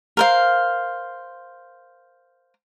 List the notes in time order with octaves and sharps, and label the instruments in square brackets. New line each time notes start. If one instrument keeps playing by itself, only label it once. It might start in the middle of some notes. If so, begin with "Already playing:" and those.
[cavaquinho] A#4 C5 F5